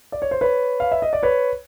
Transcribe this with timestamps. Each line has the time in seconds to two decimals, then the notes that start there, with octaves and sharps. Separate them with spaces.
0.12 D5
0.22 C#5
0.31 C5
0.41 B4 C#5
0.80 F5
0.92 E5
1.02 D#5
1.13 D5
1.23 B4 C#5